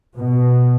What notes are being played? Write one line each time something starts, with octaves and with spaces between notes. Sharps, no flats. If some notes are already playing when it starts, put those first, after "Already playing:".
B2